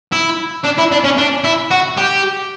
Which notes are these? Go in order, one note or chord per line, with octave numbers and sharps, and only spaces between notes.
E4
D4
E4
D4
C#4
D4
E4
F#4
G4